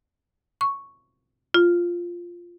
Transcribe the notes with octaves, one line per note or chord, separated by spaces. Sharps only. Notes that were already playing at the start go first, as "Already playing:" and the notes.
C#6
F4